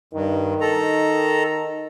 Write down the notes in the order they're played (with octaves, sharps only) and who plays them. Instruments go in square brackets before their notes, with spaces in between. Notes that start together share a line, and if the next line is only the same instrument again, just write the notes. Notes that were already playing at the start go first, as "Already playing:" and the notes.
[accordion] G2 [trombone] D#3
[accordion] A4 A#5